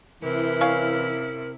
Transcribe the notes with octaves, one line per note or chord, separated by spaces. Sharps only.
C3 E3 E4 A#4
C#4 F5